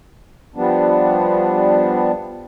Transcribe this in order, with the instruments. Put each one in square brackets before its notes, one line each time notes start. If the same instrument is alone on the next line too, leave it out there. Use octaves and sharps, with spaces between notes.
[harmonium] F3 G3 B3 D4